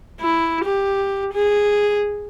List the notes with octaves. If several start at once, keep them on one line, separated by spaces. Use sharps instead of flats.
E4
G4
G#4